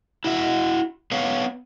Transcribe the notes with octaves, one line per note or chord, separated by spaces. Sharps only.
E4 F#4 E5
B3 B4 C#5 F5